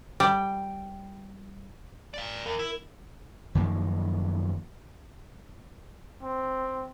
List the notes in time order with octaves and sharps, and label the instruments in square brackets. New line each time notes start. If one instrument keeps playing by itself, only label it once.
[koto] G3 [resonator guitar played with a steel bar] G5
[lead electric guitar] D5 F5
[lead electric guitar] E2 [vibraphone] A#4
[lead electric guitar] E4
[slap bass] F#2 D#3 F3 A#3
[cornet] C4